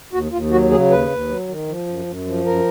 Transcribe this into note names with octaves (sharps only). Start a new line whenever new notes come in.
D#2 F#4
D#2 F4
F#3 F#4
C#3 G#4
D#2 B4
D#2
F#3
D#3
F3
F#2
F#2
F3
F#2 A#4